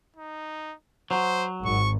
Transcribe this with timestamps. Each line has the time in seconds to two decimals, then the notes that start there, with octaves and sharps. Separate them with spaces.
0.16 D#4
1.11 F#3 C5
1.65 G#1 C#6